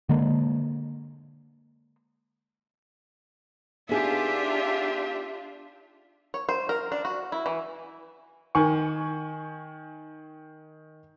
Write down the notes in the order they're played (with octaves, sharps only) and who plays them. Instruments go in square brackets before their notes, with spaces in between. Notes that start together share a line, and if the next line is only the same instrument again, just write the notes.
[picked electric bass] D3 G#3 A#3
[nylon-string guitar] B3 D#4 G#4 [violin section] D4 F4 [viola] G4 E5
[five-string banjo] C#5
C5
A#4
D4
F#4
E4
E3
[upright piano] D#3 G#5 C#6